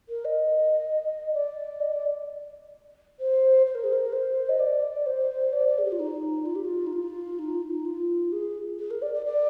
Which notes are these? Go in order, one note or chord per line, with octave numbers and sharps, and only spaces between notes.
A#4
D#5
D5
D#5
D5
C5
C5
A#4
G#4
A#4
C5
D#5
D5
C5
D5
D5
G#4
G4
F4
D#4
F4
G4
F4
D#4
F4
D#4
F4
D#4
F4
G#4
G#4
A#4
D5
D5
D5